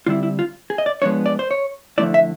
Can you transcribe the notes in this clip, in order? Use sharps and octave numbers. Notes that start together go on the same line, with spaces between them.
D3 G3 C4 E4 F4
E4
F4
G#4
D#5
D5
F3 G#3 B3 D4 C#5
D5
C5
C#5
D3 F3 A3 C#4 E4 D5
E5